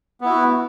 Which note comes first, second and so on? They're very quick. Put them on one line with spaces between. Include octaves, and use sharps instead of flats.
B3 E4 F#4